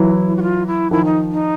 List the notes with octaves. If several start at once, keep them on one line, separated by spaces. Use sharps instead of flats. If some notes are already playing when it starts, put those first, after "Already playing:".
Already playing: E3 F#3 E4
F#4
F4
E4
D#3 F3 E4
D#4
D#4